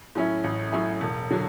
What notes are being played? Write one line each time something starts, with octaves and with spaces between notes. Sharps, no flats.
A2 F#3 C#4 E4
A1
A2 F#3 C#4 E4
E1
D3 F#3